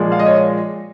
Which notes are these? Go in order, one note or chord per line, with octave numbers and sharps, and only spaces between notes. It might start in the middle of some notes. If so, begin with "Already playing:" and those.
Already playing: A#2 F3 G#3
F5
D#5
C#5